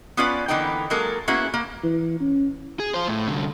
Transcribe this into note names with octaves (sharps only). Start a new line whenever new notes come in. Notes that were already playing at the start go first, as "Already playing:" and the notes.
B3 C#4 F4 B4 D5
D3 E3 A#3 B3 D#4 G5
F#3 G#3 A#3 A4 A#4
A#3 B3 C#4 E4 F#4 G#4
A#3
E3
C#4
G#4
F4 C5
A2
C2 D3